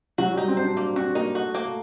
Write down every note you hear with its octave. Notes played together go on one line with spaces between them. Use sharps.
F#3 F#4
G3 D#4
C4
C5
D4
A#3
C4 F#4
A#3 D#4
A3 F#4
A#3
A3